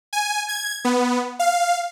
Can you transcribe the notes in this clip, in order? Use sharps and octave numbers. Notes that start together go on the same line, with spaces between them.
G#5
G#6
B3
F5